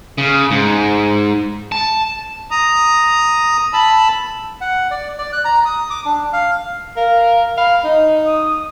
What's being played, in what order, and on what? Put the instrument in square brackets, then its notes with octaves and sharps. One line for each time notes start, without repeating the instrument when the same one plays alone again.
[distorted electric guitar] C#3
G#2
A5
[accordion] A#5 D#6
A5 B5 E6
[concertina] F#5
D5
D5
F#6
A#5
D#6
D6
D4
F5
[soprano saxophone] A#4 [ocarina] F5
[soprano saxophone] F5 [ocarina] B5
[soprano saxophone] D#4 [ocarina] D#5
[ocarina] D#6